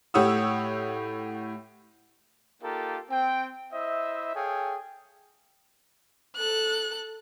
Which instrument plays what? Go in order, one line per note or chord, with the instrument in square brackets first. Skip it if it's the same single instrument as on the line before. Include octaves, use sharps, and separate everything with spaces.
[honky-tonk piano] A2 G4 C#5 F#5 D#6 E6
[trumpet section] A#3 D#4 F4 G4 A4 A#4
C4 G5
E4 C5 D#5 E5
G#4 A4 C#5 F5 G5
[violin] A4 F#6